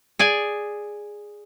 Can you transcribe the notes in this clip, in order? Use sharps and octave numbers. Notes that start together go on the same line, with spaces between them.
G#4 D5 G#5